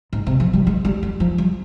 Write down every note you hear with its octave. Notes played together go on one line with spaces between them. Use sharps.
G#2
C3
F3
G3
G#3
G3
G3
F3
G3